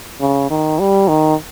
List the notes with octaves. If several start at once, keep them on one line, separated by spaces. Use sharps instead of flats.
C#3
D#3
G3
D#3